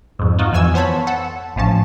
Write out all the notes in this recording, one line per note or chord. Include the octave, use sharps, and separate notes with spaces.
F2 G#2
D#4 F4 F#4
F2 E3 G#5 E6
B3 C5 C#5 A5 B5
A4 F#5
A1 F3 C#4 A5